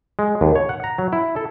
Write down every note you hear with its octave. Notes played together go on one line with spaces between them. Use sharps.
G#3
D#2
C#5
F#5
A#5
F#3
E4
A4